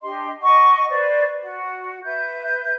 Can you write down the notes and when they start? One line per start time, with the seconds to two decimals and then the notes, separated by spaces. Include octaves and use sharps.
0.01 D4 G4 D#5 C6
0.41 D#5 F#5 C#6
0.89 B4 C5 D5
1.40 F#4
2.04 B4 E5 G6